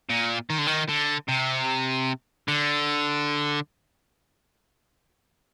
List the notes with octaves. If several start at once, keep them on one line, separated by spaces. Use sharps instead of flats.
A#2
D#3
D3
D#3
D3
C3
D3